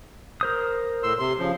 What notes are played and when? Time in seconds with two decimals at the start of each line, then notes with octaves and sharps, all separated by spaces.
0.41 A#4 C5 D#6
1.03 A2 C6 E6
1.19 C3 C6
1.39 C#3 F3